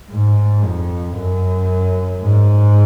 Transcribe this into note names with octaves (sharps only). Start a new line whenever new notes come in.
G#2
F2
F#2
G#2